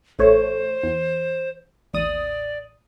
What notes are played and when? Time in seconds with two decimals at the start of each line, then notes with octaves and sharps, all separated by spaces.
0.19 A1 A3 C5 C#5
0.83 E2
1.94 A1 D#2 D5 D#6